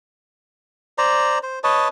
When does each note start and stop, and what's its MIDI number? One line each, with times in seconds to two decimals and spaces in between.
0.98 1.38 72
0.98 1.38 74
0.98 1.38 82
1.43 1.59 72
1.64 1.88 71
1.64 1.88 73
1.64 1.88 75
1.64 1.88 81